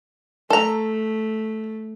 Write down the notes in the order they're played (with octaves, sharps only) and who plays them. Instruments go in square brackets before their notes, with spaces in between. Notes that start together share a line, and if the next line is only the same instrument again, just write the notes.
[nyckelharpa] A3 [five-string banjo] A4 A#5